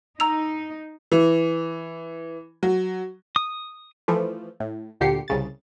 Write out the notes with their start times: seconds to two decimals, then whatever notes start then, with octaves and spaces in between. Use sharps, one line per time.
0.20 D#4 A#5 E6 F7
1.12 E3
2.63 F#3
3.36 D#6
4.08 E3 F3 A3
4.60 A2
5.00 D2 A#2 D3 G4 C7 C#7
5.28 C2 C#3 A6